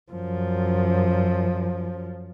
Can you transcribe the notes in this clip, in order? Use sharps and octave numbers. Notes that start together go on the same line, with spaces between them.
F#2 F3